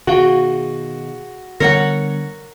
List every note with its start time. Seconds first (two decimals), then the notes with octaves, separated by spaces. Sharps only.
0.07 B2 D#3 F#4 G#4 F5
1.60 D3 G3 B3 A#4 C#5 F#5 A#6 C#7